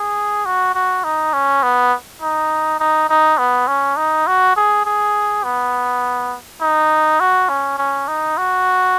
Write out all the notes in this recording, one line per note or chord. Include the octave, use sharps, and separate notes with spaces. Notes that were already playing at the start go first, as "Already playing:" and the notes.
Already playing: G#4
F#4
F#4
D#4
C#4
B3
D#4
D#4
D#4
B3
C#4
D#4
F#4
G#4
G#4
B3
D#4
F#4
C#4
C#4
D#4
F#4